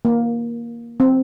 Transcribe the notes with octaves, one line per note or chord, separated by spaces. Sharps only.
A#3
C4